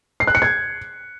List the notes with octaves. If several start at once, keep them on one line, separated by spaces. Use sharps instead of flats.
C7
F#6
C#7
G#6